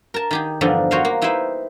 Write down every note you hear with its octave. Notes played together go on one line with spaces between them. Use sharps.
A#4 A5
D#3 G4 G#4
E2 G2 D3 F3 D4 D#4
F#4 A#4 C5 C#5 D#5 F5
A#3
D#4 E4 G4 B4 C5 E5